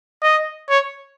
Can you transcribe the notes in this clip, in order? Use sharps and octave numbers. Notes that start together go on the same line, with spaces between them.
D#5
C#5